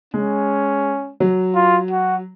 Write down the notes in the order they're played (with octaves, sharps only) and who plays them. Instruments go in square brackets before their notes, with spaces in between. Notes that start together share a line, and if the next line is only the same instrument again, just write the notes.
[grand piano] G#3 [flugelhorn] C#4
[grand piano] F#3
[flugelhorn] F4
F#4